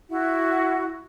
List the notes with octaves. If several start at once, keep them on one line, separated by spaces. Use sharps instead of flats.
E4 F#4